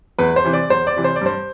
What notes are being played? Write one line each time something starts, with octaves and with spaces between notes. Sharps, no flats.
E2 B4
C5
C3 E3
D5
E2 C5
D5
C3 E3
C5
D5
G2 C5